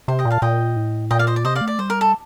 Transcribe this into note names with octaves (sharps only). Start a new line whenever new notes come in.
C3 C5
D#5 G5
A#2
F5 A5
A#2 D#5 G5
A2
A#2 D#5 G5
D5 F5
C5 D#5
D5
C3 C5 D#5
D5 F5
A3
D5
G3 C5
A#4
A4